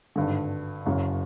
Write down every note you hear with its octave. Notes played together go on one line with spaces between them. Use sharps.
G#1 G2 D3
F#1 F#2 C#3